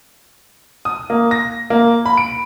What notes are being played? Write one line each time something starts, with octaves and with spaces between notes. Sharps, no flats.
D#6
A#3
A#6
A#3
B5
D7